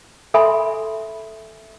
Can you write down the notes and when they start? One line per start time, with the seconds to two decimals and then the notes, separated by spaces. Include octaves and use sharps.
0.34 A4 E5 G#5 B5 C6